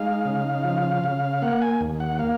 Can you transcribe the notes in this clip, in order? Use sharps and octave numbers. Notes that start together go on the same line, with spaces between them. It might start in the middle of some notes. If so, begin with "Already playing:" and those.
Already playing: G#3 D#4 F5
C#3
F3
C#3
A#3 F#5
G#5
D#2
F#5
A#3 F5